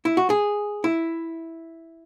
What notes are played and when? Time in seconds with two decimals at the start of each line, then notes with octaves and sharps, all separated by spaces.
0.05 E4
0.17 F#4
0.30 G#4
0.84 E4